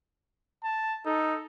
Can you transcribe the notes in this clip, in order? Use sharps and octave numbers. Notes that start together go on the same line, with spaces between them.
A5
D#4 A4